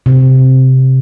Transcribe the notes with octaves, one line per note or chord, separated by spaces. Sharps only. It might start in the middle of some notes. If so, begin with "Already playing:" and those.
C3